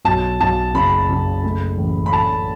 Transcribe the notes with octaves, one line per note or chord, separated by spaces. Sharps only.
B1 A5
B1 A5
F#1 B5
F#1
A3
A1
B5
A4 A5